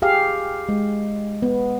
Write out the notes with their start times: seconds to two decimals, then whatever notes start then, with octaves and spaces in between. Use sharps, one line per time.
0.02 G4 G#4 F5
0.69 G#3
1.42 B3